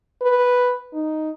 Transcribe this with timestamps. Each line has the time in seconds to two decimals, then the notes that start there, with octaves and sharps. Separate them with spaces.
0.22 B4
0.93 D#4